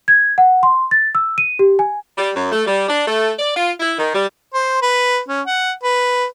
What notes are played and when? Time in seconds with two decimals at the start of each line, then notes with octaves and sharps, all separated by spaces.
0.08 G#6
0.38 F#5
0.63 C6
0.91 A6
1.15 E6
1.38 D#7
1.59 G4
1.79 G#5
2.18 G3
2.35 F#2
2.52 A3
2.66 G3
2.88 D4
3.06 A3
3.38 D5
3.55 F4
3.80 E4
3.98 D#3
4.14 G3
4.54 C5
4.82 B4
5.29 C#4
5.46 F#5
5.83 B4